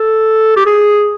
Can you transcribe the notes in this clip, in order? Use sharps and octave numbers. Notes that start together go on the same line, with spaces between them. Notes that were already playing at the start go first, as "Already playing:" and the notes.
Already playing: A4
G4
G#4